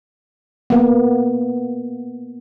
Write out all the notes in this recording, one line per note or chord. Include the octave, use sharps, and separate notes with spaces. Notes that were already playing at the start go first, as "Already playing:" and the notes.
A#3 B3